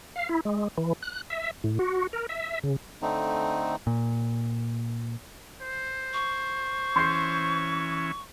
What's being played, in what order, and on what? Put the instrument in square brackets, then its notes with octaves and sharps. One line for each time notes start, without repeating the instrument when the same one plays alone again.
[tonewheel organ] F5
E4
G#3
E3
F#6
E5
A2
F#4
A#4
E5
C#3
[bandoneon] D3 A3 C4 D#4
[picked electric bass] A#2
[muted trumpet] C5
[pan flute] C#6
[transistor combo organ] E3 C#4 [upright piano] C6 G6 C7